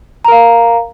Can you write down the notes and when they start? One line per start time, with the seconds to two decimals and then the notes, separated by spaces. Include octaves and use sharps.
0.25 A#5
0.28 A#4
0.32 F5